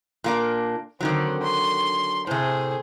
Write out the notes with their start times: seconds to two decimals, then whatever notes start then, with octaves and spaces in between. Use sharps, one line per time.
0.24 A#2 A#3 D4
1.00 D3 D#3 F#3 C4
1.42 C6
2.27 A2 C3 G#4 C5